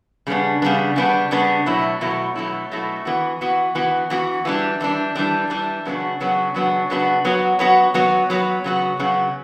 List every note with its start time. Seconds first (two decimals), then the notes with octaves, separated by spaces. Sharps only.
0.27 C#3 G3 B3 D4
0.62 C#3 G3 B3 D4
0.96 C#3 G3 B3 D4
1.31 C#3 G3 B3 D4
1.66 B2 F#3 A3 E4
2.01 B2 F#3 A3 E4
2.35 B2 F#3 A3 E4
2.72 B2 F#3 A3 E4
3.05 E3 B3 F#4
3.41 E3 B3 F#4
3.75 E3 B3 F#4
4.10 E3 B3 F#4
4.45 E3 G3 D4
4.81 E3 G3 D4
5.15 E3 G3 D4
5.50 E3 G3 D4
5.85 C#3 F#3 B3 D4 F#4
6.20 C#3 F#3 B3 D4 F#4
6.54 C#3 F#3 B3 D4 F#4
6.90 C#3 F#3 B3 D4 F#4
7.25 F#3 B3 F#4
7.59 F#3 B3 F#4
7.94 F#3 B3 F#4
8.30 F#3 B3 F#4
8.64 C#3 F#3 B3 F#4
8.99 C#3 F#3 B3 F#4